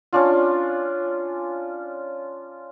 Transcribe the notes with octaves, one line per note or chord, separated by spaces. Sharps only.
C#4 D4 F4